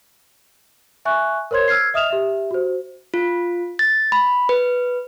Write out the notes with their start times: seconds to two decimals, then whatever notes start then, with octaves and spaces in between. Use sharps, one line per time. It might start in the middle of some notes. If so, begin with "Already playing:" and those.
1.05 E5 G#5 C#6 F#6
1.51 A#4 C5 C#5 C6 G#6
1.68 E6 F6 G#6 C7
1.94 D#5 E5 D#6 F6 E7 F7
2.10 G4 E5
2.51 F#4 C5
3.14 F4
3.79 A6
4.12 B5
4.49 B4